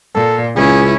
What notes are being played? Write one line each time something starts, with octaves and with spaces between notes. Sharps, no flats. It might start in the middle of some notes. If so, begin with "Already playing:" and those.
A#2 A4
C#2 C#4 E4 G#4